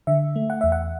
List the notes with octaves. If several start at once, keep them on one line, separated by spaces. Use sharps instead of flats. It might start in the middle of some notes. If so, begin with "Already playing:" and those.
D3 E5
A3
F#5
E2 E5
F#5